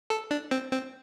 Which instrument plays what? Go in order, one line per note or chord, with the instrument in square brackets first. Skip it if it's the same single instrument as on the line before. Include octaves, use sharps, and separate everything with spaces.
[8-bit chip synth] A4
D4
C4
C4